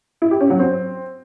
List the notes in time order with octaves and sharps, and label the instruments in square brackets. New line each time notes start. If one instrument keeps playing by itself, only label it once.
[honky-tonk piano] E4
G4
C#4
F#3
C4